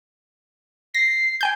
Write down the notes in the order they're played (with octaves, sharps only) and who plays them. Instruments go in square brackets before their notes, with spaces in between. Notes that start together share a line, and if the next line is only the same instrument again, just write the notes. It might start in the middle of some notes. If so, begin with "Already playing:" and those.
[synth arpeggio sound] A#6 [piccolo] C7
[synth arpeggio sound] G5 G#5 G6